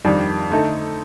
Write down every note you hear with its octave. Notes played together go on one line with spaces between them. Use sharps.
F2 D#3 G3 D4
D3 A3 D#4 A4